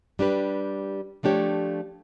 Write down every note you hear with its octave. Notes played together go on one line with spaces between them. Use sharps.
G3 D4 G4 B4
F3 A3 D4 G4 C#5